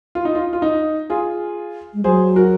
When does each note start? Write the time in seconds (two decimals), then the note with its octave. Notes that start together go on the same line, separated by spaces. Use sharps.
0.15 F4
0.25 D#4
0.35 F4
0.53 F4
0.62 D#4
1.10 F4 G#4
1.94 G#3
2.04 F#3 G#4 C5
2.36 F#4 A#4